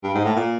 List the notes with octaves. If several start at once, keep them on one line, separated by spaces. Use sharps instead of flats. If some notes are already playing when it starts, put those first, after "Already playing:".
G2
G#2
A2
A#2